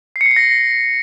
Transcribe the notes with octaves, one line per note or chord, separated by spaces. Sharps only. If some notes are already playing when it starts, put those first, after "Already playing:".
C7
C#7
C7
C#7
A#6